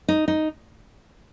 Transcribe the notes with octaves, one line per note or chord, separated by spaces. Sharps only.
D#4
D#4